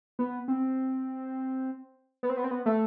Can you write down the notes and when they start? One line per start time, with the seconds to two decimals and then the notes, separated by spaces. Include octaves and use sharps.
0.19 B3
0.48 C4
2.23 B3
2.29 C4
2.37 B3
2.44 C4
2.51 B3
2.66 A3